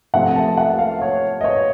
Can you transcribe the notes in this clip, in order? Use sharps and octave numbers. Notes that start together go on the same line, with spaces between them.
C3 F3 A3 C4 F#5
A5
F#5
F5
C#5
D#5
C#5